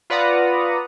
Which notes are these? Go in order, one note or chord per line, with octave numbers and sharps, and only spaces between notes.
F4 B4 D5 F#5 A#5 D#6